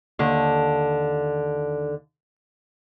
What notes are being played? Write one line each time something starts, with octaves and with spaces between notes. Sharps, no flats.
D#2 D3